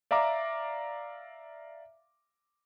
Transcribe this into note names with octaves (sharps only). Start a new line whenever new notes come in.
D5 E5 F5 A#5 D6